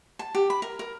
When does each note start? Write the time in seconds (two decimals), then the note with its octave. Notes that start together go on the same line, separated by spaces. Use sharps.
0.19 A5
0.35 G4
0.50 B5
0.62 A#4
0.79 A#4